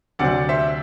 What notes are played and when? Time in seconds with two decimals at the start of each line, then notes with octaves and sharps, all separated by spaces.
0.19 D2 C3 F#3 C4 D5 F#5
0.49 C5 E5